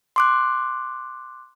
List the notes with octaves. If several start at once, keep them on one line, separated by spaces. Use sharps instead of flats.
C6 D6 F#6